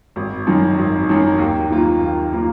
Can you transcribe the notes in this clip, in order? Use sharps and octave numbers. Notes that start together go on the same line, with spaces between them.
G#1
F#2 D#3 F#3
G#1
F#2 D#3 F#3
D#2
D#3 A#3 F4
D#2
D#3 A#3 F4